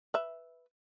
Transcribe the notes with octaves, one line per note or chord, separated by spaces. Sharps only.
B4 E5